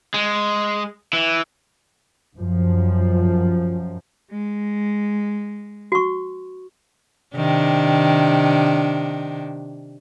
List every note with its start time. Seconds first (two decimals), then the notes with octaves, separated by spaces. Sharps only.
0.14 G#3
1.13 E3
2.37 F#2 F3
4.30 G#3
5.92 F#4 C#6
7.36 C3 D#3 D4